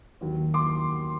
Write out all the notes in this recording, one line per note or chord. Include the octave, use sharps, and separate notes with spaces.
D#2 D#3 F#3
C6 D6